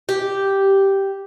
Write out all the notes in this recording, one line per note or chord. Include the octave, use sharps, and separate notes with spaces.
G4